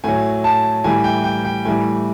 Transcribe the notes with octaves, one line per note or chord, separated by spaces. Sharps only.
A2 F#3 G#5
A5
A2 E3 G3 G#5
G5
G5
G5
A2 E3 G3 G#5